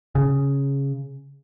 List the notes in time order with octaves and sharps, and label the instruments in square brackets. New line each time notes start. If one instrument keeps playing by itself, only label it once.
[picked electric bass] C#3